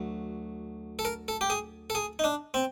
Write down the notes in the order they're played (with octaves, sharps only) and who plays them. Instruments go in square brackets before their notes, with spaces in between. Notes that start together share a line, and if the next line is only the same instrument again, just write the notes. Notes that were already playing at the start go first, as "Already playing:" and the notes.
Already playing: [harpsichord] D2 F#3
A4
A#4
A4
G4
G#4
A4
G#4
D#4
D4
C4